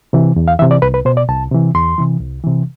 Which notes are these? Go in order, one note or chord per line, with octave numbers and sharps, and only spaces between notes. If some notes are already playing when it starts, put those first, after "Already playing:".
C3 E3
E2
F5
C3 E3 E5
D5
C2 B4
B4
B2 C5
D5
C2 A5
C3 E3
E2 C6
C3 E3
C2
C3 E3